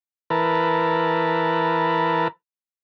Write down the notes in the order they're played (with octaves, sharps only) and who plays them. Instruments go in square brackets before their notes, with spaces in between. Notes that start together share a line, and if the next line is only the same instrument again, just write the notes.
[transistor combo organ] E3 A#4 B4 A5